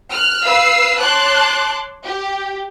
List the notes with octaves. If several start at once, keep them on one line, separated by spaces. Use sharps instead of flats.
F6 F#6
B4 F5 E6 C7
C#5 A5 C6 D6 F#6
G4